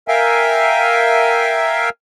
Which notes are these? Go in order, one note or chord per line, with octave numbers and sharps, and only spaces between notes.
A#4 E5 F5 G5 G#5